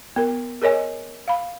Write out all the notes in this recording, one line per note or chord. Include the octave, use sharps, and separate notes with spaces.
B3 A#4
G#4 A#4 C#5 D#5 G#5
F5 B5